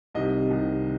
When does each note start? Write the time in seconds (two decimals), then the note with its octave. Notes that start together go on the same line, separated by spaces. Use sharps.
0.14 C2 C3 D#3 G3 D#5
0.49 C2 C3 D#3 G3